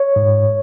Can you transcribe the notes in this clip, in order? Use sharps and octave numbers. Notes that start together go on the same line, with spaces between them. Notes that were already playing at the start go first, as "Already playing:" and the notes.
Already playing: C#5
G#2